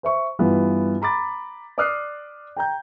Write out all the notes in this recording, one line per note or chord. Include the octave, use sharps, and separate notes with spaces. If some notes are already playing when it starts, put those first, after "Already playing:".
C5 E5 C#6
G2 E3 B3 F4
A#5 B5 D6 A6
D5 D6 D#6 F6 F#6 C7
G5 A#5 G6